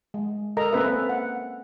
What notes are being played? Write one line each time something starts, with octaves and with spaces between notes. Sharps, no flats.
G#3
A4 A#4 D#5 A#5
A#3 C4 C#4 A4 B4 E5
F#5